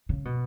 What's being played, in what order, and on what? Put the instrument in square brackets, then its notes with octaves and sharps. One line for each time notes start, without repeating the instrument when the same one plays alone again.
[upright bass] C#3
B2